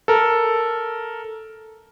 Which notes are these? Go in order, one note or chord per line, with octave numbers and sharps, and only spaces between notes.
A4 A#4